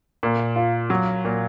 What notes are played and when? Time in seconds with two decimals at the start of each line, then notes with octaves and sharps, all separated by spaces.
0.23 A#2
0.56 F4
0.90 F#3
1.25 A#2